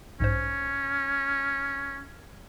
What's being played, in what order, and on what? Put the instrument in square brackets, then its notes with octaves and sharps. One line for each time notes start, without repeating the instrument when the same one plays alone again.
[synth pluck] B1 G#2 C5 [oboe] C#4